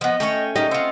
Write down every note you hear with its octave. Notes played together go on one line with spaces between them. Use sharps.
F3 B3 D#5
A3 C#4 C#5 G5
D#4 G4 A#4 D#5
C4 F4 F#5